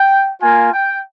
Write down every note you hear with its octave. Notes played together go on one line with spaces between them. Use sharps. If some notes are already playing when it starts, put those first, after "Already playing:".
Already playing: G5
A#3 F4 G#5
G5